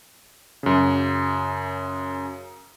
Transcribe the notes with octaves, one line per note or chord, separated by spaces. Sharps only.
F#2 C#3